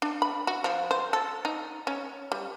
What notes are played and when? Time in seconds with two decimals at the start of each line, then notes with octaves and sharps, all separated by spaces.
0.02 D4
0.22 B5
0.47 F#4
0.64 F3
0.91 C5
1.13 A4
1.45 D#4
1.87 C#4
2.32 G3